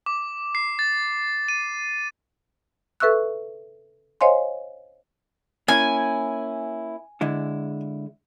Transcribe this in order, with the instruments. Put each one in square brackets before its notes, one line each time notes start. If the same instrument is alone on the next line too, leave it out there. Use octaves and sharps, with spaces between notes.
[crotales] D6
C7
A6
D#7
[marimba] A4 B4 E5 C#6 E6 F#6
C5 C#5 D#5 F5 G#5 C6
[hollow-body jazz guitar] A#3 C#4 E4 [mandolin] G#5
[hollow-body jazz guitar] D3 G#3 E4